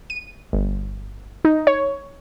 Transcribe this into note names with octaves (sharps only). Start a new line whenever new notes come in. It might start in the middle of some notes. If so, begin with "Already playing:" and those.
D#7
G1
D#4
C#5